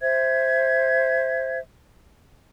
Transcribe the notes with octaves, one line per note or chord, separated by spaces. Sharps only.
C5 E5 G#6